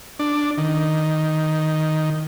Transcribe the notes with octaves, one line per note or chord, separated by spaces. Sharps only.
D4
D#3